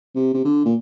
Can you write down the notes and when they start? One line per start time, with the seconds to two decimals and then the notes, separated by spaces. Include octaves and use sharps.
0.16 C3
0.34 C3
0.45 D3
0.65 A#2